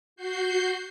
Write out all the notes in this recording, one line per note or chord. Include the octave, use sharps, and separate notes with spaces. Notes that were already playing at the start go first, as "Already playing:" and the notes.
F#4 G6 C7